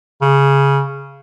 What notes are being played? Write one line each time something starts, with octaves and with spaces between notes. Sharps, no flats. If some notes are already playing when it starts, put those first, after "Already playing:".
C#3